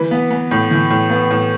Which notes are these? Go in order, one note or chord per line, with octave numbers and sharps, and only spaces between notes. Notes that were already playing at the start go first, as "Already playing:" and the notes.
Already playing: E3 B4
B3
B3
A2
E3
A2
B3
A2